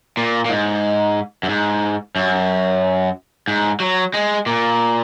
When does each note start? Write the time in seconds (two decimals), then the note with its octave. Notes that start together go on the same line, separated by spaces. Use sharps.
0.17 A#2
0.45 A#2
0.50 G#2
1.43 F#2
1.49 G#2
2.16 F#2
3.48 G#2
3.80 F#3
4.14 G#3
4.46 A#2